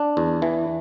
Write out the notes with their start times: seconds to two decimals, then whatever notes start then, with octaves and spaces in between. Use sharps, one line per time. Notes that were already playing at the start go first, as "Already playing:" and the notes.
Already playing: D4
0.17 E2
0.42 E3